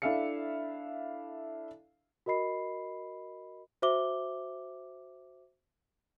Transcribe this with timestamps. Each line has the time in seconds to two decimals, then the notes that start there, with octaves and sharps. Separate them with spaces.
0.02 D4 E4 A4 E5 F5 C#7
2.26 F#4 A#4 D#5 B5 C7
3.82 F#4 C5 E5 D6 G7